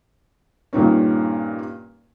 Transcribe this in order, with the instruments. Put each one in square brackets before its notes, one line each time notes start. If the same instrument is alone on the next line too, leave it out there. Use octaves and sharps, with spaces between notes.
[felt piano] G2 A#2 D#3 C#4